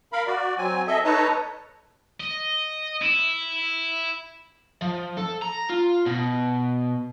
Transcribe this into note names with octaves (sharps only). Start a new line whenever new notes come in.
A#4 F5 B5
F#4 D5
F#3 C4 G#5
A4 D#5 E5
D#4 A4 B4 C#5 A5 A#5
D#5
E4
F3
A4
A#5
F4
B2